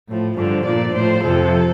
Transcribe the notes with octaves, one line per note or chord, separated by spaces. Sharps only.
A2 F3
G2 D3 F3
A#2 F3 D5
A2 F3 C5
F2 C3 F3 A4